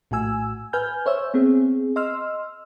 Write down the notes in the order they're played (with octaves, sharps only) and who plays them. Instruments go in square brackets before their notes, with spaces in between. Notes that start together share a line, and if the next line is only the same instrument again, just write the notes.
[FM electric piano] A#1 A2 F#4 G#5 E6
B4 G#5 F6 G6
C5 C#5 E5 E6
B3 C4 G#4
D#5 C6 E6 F6